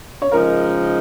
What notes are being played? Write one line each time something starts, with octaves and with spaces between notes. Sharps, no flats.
C#5
C#3 F3 G#3 D#4 A#4